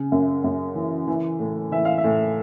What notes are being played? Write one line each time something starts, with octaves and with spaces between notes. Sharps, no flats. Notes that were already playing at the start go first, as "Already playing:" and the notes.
Already playing: C#3
F#2
F#2
E3
E3
A2
E3 E5
F5
E5
A2